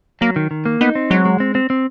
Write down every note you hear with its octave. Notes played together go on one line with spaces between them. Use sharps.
F#3 A#3
D#3
D#3
A#3
B3 D#4
C4
F#3 G#3
G#3
C4
C4
C4